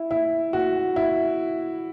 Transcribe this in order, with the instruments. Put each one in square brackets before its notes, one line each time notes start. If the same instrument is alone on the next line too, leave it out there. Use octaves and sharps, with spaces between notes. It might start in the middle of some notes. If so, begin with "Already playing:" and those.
Already playing: [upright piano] E4
E4
F#4
E4